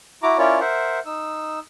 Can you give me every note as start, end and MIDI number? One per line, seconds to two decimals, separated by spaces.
0.23 0.38 64
0.23 0.38 66
0.23 0.38 82
0.23 0.38 86
0.38 0.60 61
0.38 0.60 64
0.38 0.60 65
0.38 0.60 70
0.38 0.60 73
0.38 0.60 74
0.60 0.99 70
0.60 0.99 72
0.60 0.99 76
0.60 0.99 78
1.06 1.59 63
1.06 1.59 88